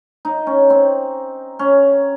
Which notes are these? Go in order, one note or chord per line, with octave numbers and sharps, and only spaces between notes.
D#4
C#4
C4
C#4